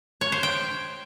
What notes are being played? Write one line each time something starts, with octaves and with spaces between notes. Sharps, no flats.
C#5
C5
G5